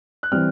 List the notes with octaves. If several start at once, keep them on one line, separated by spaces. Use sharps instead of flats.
F#6
E3 G3 C4 F6